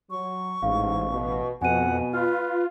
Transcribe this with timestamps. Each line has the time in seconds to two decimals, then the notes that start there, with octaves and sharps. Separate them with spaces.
0.11 F#3 C#6
0.62 A1 G#2 F5
1.10 B2
1.62 F2 B2 F#5 G#5 D#7
2.13 F4 B4 F6